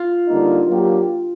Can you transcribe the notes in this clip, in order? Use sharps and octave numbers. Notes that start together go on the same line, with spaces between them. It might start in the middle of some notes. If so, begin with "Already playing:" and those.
Already playing: F4
D3 G3 A#3 D#4
F#3 A#3 D4 G4